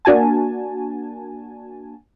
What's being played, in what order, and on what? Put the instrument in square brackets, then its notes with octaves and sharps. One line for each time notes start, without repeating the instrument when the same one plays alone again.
[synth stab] A#3 D4 F#4 G#5 A5